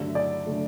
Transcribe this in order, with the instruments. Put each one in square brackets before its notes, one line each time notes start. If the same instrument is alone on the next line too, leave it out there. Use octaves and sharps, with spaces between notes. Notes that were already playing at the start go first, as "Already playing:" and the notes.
Already playing: [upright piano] G2 D3 F#3 A3 E5
D5
D3 F#3 A3